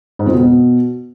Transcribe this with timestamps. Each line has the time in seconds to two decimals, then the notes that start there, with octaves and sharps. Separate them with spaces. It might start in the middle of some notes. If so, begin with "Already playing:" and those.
0.19 G#2
0.26 F2
0.33 B2